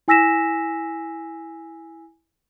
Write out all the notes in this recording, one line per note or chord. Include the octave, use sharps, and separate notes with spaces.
E4 G#5 E6 A#6 B6 E7